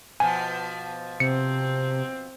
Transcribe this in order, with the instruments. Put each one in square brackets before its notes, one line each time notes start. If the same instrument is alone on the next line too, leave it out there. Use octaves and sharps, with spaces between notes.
[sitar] B2 F3 [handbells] G#5
[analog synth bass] C3 [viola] C4 [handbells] C#7